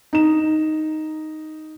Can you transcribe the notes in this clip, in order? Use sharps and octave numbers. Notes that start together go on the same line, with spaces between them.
D#4 E7